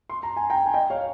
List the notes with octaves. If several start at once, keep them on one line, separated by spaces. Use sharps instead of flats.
C6
A#5
G#5
G5 A#5
G#5
D#5 G5
C#5 F5